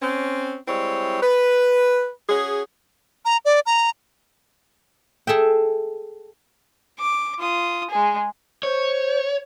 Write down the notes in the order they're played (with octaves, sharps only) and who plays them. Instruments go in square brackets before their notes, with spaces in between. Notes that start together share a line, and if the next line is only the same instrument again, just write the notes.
[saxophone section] C4 C#4
G3 G#3 C4 E4 C#5
B4
C#4 F#4 G#4
[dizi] A#5
D5
A#5
[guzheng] G#4 A4 E5 G5
[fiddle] D6
F4 D#6
G#3 G#4
[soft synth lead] C5 [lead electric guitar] C#5